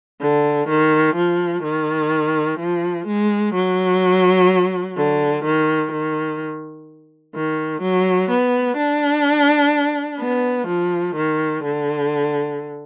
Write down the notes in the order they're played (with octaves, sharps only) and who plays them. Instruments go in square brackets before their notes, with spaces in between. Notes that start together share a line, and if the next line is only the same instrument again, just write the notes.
[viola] D3
D#3
F3
D#3
F3
G#3
F#3
D3
D#3
D#3
D#3
F#3
B3
D4
B3
F3
D#3
D3